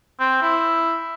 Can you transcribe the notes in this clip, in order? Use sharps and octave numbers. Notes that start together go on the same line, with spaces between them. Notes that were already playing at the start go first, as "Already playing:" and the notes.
C4
E4